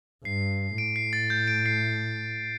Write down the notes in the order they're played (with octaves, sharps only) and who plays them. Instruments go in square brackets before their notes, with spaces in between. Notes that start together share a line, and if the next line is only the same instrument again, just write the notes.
[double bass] G2 [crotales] C7
[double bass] A2 [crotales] D7
[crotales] C7
A6
G6
D7
C7